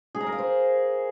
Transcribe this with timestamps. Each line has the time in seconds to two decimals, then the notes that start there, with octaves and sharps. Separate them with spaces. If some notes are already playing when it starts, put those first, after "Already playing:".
0.15 G#4
0.21 A#5
0.26 A#4
0.32 F5
0.38 C5